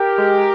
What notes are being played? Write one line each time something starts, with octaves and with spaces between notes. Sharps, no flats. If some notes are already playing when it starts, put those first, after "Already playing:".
Already playing: G4 A#4
G#3